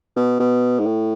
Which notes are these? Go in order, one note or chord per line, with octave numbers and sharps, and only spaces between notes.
B2
B2
G#2
A2